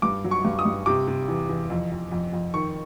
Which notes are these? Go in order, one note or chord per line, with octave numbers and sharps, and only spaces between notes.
G2 D6
F#3
C#6
G2
D#6
G2
C3 D6
C3
E2
E2
F2
F2
F2
F2
D#3 C#6